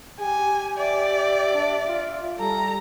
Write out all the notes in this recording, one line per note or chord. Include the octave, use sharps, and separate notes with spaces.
G4 G#5
D5 E5
D4
F4
G3 A4 A#5